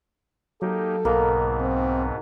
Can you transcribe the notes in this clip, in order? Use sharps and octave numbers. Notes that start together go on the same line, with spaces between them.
F#3 A#3 D#4 G4 A4
B1 G#2 B2 A#3 B3
C4